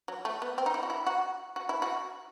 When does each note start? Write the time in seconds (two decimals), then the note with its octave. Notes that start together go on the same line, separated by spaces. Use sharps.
0.08 F#3
0.25 A3
0.42 B3
0.58 C4
0.66 D#4
0.74 E4
0.83 F#4
0.90 E4
1.07 F#4
1.56 F#4
1.69 E4
1.82 F#4